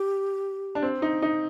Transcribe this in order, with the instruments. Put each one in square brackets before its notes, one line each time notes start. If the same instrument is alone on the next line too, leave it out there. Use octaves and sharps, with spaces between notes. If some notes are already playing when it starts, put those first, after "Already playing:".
Already playing: [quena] G4
[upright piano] D4
C4
D#4
D#4